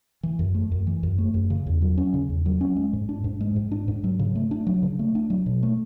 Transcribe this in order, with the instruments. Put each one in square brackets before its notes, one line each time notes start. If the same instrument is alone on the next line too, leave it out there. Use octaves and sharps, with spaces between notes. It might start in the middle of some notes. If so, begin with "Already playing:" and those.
[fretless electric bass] E3
F#2
A3
F#2
E3
F#2
A3
F#2
C#3
E2
F#3
C#4
C#3
E2
F#3
C#4
G#3
G#2
D4
G#2
G#3
G#2
D4
G#2
F#3
C#3
A3
D4
F#3
C#3
A3
D4
F#3
B2
A3